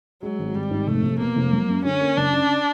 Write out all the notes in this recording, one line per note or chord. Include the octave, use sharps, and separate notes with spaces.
F#3 G#3
G#1
G#1 G3
G#2
F1 A3
F1
B2 A#3
F1
F#3
F#2
D3 C#4
A#3
F#1 D4
C#3